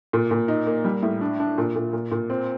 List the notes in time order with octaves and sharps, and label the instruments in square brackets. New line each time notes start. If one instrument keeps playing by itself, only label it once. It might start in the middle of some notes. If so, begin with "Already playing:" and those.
[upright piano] A#2
A#2
D#4
A#3
G3
A2
D4
D4
A#2
A#2
A#2
A#2
C4